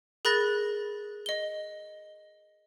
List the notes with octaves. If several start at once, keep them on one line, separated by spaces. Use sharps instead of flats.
G#4 A#4 B5 F#6 A6 A#6
D#5 G7